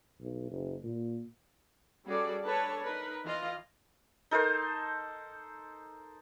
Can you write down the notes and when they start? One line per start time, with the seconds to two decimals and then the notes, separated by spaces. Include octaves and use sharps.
0.21 B1
0.51 F#1
0.84 A#2
2.05 G3 C#4 F#4 G#4 A4 D5
2.45 D4 A4 B4 C#5 A5
2.82 D#4 A#4 B4
3.25 E3 F4 D#5
4.31 D#4 A4 A#4 C5